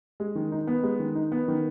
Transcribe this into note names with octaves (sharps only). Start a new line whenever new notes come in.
G#3
D#3
D#4
B3
G#3
D#3
D#4
B3
D#3